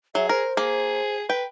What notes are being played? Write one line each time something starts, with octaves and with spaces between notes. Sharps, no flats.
F#3 G#4 E5
A#4 C5
A#3 G#4
B4 G5